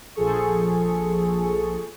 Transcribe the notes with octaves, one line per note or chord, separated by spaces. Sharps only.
A#1 F3 G#4 A4 C#6